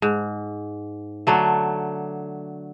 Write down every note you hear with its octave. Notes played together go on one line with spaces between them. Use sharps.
G#2
D3 F#3 A3